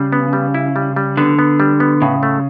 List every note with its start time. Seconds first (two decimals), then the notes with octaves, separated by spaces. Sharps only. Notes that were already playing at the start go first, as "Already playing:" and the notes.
Already playing: C#3 G3
0.13 B3
0.33 G3
0.54 E4
0.76 G3
0.96 G3
1.17 D3 B3
1.39 B3
1.60 G3
1.80 B3
2.02 A2 C#3
2.23 A3